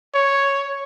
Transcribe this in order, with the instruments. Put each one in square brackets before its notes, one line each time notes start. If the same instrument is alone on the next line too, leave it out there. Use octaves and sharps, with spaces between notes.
[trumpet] C#5